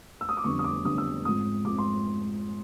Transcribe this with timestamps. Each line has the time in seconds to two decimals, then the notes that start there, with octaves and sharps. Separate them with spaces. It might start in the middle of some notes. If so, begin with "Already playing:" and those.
0.21 E6
0.29 D#6
0.37 D6
0.44 F2 D3 G3 B3 D4 C#6
0.59 D#6
0.64 D6
0.85 F2 D3 G3 B3 D4 D#6
0.98 E6
1.25 G#2 F3 G#3 C4 D#6
1.65 G#2 F3 G#3 C4 D6
1.78 C6